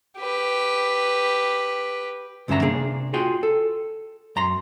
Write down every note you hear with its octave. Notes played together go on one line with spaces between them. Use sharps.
G4 B4
C#2 G2 D3 C#4 E5 A#5
C3 A#3 D4 G#4
F4 F#4 G#4 G5
A4
F#2 A#5 C6